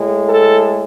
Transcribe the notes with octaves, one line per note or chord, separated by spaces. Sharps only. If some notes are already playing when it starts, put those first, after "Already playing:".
Already playing: A2 G#3
A4